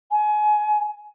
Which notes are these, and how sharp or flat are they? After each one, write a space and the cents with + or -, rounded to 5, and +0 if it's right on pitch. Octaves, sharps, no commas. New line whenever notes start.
G#5 +25